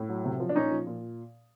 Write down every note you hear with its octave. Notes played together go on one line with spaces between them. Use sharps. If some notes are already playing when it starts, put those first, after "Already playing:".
Already playing: A2
F#3
C3
F3
D4
A#2 C#4 D#4
F3
A#2